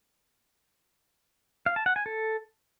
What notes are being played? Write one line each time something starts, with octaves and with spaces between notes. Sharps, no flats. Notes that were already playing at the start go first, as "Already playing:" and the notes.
F5
A5
F#5
G#5
A4